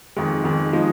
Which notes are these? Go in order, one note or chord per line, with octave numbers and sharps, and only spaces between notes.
F2 D#3 G#3
F2 D#3 G#3
F3 G#3 D#4